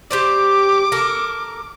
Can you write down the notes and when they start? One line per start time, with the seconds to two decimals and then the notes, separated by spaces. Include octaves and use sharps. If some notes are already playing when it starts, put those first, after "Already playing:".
0.11 G4 C5 D5 D6
0.92 A4 A#4